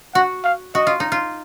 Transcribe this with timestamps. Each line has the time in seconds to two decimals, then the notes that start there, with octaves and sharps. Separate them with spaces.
0.14 F#4 F#5
0.44 F5
0.75 F#4 D#5
0.87 F4
1.00 D#4
1.12 F4